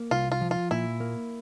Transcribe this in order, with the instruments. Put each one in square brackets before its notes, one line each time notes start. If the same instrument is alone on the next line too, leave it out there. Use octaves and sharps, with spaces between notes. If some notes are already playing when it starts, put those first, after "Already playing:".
Already playing: [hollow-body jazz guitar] A#3
[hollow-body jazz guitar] C2 [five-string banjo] F4
[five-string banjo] F4
[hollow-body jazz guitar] F3
[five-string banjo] F4
[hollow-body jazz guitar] A#2 [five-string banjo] E4
[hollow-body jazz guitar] A#3